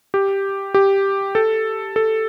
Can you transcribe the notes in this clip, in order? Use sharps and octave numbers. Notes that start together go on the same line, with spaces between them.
G4
G4
A4
A4